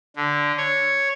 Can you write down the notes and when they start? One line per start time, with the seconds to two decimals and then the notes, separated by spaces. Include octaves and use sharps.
0.16 D3
0.57 C#5